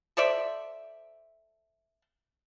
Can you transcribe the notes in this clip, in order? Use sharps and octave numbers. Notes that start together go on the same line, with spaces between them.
A4 C5 D5 E5